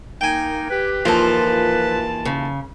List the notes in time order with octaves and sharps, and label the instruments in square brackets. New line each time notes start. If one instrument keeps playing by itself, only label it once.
[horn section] A#3 [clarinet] D#4 [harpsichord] G5 G#5
[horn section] G4 [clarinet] B4
[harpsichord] D#2 A#3 F4 [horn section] E3 A5 [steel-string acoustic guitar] F3 A4
[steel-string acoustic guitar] C#3